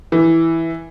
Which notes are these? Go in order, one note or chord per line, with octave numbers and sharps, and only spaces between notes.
E3